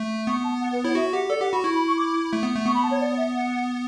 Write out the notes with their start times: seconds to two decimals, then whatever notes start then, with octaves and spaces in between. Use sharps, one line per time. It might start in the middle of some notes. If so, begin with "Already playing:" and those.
Already playing: A3
0.27 B3 C#6
0.44 A5
0.61 F#5
0.73 B4
0.84 E4 C#5
0.95 F#4 E5
1.13 G4 F#5
1.30 A4 D5
1.41 G4 F#5
1.52 F#4 B5
1.64 E4 C#6
1.75 B5
1.87 C#6
1.98 D6
2.33 A3
2.43 B3
2.55 A3
2.66 B3 C#6
2.74 B5
2.83 A5
2.91 C#5
3.01 D5
3.17 E5
3.34 F#5